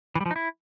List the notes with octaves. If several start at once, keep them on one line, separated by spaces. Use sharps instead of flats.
E3
G3
F3
D#4
E4